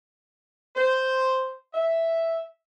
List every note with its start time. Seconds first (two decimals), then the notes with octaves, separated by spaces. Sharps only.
0.76 C5
1.74 E5